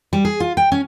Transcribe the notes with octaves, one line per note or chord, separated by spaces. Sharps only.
G3
G#4
F4
G5
C#4